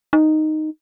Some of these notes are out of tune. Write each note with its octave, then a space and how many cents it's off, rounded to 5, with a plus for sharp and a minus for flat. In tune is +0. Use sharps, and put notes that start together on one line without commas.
D#4 -5